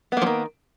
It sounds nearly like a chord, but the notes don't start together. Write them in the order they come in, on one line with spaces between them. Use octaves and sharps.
B3 A#3 F3 D#3